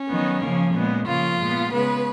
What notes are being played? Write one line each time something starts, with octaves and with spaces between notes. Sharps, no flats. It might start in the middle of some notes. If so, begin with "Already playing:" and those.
Already playing: C#4
D#3 F#3 B3
C#3 F3 A#3
A#2 G#3 B3
C#3 F3 A#3 F4
A#2 G#3 B3
C#3 G#3 B3 B4